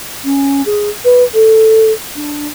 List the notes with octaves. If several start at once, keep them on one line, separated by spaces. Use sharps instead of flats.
C#4
G#4
B4
A4
D4